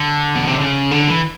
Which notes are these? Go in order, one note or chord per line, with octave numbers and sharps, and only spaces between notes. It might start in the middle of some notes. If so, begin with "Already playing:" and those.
Already playing: D3
B2
C3
C#3
D3
E3